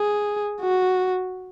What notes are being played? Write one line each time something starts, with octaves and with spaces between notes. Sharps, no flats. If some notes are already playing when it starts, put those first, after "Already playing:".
Already playing: G#4
F#4